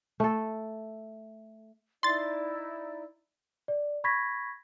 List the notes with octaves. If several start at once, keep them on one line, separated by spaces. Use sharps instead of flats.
A3 A4
D#4 E4 D5 C6 A6
D5
B5 C#6 G#6 A#6 B6